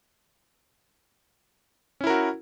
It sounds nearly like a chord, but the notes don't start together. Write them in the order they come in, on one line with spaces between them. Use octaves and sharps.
C#4 E4 A#4 F#4